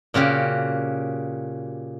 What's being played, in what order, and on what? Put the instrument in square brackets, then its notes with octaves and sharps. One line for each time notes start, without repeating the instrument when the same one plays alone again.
[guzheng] A#2 C#3 F#4 G4